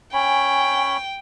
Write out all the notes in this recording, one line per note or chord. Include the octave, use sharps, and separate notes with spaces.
C#4 C#5 G5 G#5 B5